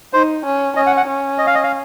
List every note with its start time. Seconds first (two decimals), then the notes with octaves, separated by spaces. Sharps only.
0.13 D#4 C5
0.45 C#4
0.76 C#4 D#5
0.87 F#5
0.97 F#5
1.07 C#4
1.38 D#5
1.47 F5
1.55 D#5
1.64 F5